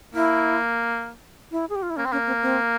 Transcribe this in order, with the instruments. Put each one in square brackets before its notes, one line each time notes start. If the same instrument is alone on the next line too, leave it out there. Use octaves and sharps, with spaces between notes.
[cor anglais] A#3 [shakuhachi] E4
[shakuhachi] E4
G#4
G4
F4
E4
[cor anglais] A#3 [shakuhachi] C#4
[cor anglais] C4
[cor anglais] A#3 [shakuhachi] C#4
[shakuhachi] C4
C4